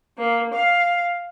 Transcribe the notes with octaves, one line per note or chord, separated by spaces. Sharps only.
A#3
F5